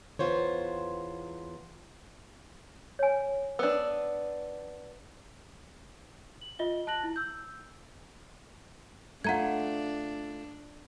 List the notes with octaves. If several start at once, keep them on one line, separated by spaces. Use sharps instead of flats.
E2 B3 F4 C5 C#5
C#5 G#5
B3 D4 E6
F#7
F4 D#5 E5 G7
A5 F#6 A#6 F#7
E4
E6 G6
A3 D4 F4 F#5 A#5 G#6